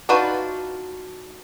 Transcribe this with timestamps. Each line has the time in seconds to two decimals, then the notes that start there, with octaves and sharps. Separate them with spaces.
0.09 D4 D#4 F4 F#4 B4